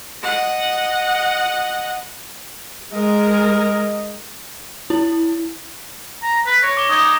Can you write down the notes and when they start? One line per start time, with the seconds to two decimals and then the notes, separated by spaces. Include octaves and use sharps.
0.23 D#5 F#5
2.93 G#3 A#4 D#5
4.90 E4
6.23 A#5
6.46 B4
6.63 C#5 A#6 D7
6.77 D6 G7
6.89 D#4 D#6 G#6 G7